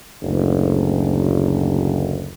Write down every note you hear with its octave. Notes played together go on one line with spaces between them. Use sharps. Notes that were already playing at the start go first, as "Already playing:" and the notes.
F#1 D2